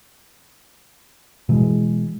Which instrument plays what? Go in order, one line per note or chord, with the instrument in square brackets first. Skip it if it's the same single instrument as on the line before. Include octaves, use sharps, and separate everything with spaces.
[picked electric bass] B2 E3 G#3